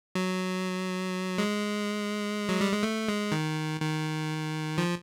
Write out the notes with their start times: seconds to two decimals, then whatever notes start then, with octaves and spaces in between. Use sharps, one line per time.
0.15 F#3
1.38 G#3
2.49 F#3
2.61 G3
2.72 G#3
2.83 A3
3.08 G#3
3.32 D#3
3.81 D#3
4.78 F3